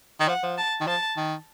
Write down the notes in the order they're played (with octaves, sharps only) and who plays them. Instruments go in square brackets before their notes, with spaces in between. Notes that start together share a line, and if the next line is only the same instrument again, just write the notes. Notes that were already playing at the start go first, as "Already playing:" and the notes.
[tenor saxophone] D#3
[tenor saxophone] F3 [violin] F#5
[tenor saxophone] F3
[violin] A5
[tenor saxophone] D#3
[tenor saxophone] F3 [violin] A5
[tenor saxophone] D#3